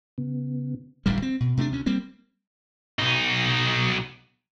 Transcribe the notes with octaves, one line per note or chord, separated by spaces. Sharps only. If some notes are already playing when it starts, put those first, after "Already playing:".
C#3 B3
D1 A1 G2 G3
C4
B2
C3 A3 B3 D4
D2 C#4
G3 A#3 C4
B1 D#4